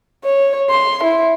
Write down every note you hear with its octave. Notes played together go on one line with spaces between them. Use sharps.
C#5
C6
E4